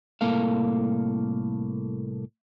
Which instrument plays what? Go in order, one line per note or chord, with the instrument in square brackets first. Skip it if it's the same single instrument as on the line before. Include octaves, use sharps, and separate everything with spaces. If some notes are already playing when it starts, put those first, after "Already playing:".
[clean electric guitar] C2 A2 A#3 A4 F5